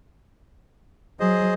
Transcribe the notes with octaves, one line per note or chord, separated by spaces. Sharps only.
F#3 G#4 C5 D#5